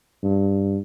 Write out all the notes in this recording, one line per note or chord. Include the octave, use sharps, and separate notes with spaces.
G2